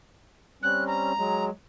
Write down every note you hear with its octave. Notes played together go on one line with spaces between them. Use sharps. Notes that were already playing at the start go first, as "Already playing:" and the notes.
G3 C4 C#4 F#6
A#5
F#3 G#3